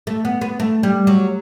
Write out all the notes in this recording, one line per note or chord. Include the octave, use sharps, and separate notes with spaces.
A3
B3
B3
A3
G3
F#3